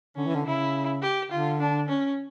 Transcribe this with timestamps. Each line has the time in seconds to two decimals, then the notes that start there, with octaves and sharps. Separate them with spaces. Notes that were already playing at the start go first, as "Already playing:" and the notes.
0.16 D3 C#4
0.27 E3
0.35 D3
0.46 C#3 E4
1.02 G4
1.31 D3 F4
1.60 D4
1.89 C#4